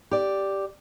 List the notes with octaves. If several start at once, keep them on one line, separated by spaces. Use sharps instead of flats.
G4 D5